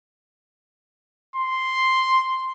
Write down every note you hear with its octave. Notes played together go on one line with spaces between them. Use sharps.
C6